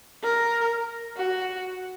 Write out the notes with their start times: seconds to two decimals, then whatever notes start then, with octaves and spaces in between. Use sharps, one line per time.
0.23 A#4
1.17 F#4